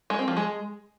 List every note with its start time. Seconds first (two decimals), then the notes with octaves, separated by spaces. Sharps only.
0.10 G#3
0.19 C4
0.28 F3
0.37 G#3